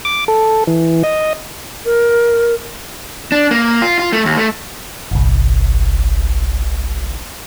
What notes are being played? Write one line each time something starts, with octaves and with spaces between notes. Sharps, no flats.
D6
A4
E3
D#5
A#4
D4
A#3
F4
F4
A3
D#2
A3
G1 C2